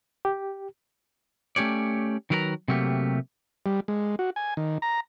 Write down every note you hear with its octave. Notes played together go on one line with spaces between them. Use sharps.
G4
A3 C#4 G4 C#5 D5
D#3 F#3 A#4 B4 D5 A#5
C3 F#3 A3 A#3 G4
G3
G#3
F#4
G#5
D#3
A#5